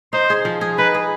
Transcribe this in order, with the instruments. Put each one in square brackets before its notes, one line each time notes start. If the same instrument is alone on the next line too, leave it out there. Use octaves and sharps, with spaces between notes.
[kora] D#4 [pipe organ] C5
[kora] G#4
F3
G#4
[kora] D#4 [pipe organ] B4
[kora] G#4